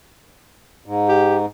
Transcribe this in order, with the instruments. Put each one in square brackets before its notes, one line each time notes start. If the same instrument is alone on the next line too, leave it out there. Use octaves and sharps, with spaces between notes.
[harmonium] G#2
[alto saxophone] G4